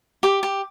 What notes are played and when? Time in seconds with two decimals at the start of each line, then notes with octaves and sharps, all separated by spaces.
0.23 G4 D6
0.43 G4